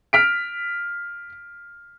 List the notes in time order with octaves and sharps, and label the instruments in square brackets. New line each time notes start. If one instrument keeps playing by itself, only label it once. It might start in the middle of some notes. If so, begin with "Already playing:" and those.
[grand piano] F6 B6 D7